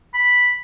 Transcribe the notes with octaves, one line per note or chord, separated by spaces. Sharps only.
B5